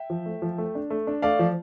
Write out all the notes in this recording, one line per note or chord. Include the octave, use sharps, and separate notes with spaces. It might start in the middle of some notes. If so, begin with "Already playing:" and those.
Already playing: E5 G5
F3
A3
F3
A3
D4
A3
D4
A3 D5 F5
F3